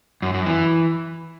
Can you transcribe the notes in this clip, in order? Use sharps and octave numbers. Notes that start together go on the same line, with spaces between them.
F#2
F#2
E3